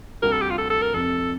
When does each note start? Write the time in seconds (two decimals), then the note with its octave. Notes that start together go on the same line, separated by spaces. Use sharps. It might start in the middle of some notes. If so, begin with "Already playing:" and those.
0.23 D2 C3 G3 A#4
0.32 A4
0.41 G4
0.50 F4
0.58 A4
0.70 A4
0.82 A#4
0.94 F1 F2 C3 A4